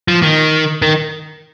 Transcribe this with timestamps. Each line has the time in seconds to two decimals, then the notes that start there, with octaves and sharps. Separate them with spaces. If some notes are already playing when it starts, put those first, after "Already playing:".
0.08 F3
0.22 D#3
0.82 D#3